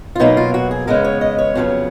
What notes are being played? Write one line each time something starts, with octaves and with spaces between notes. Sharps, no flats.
F4
B2 F#3 A#3 D#4
F4
F#4
G#4
C#3 G#3 B3 A#4
C#5
D#5
C#5
F2 C#3 F#3 B3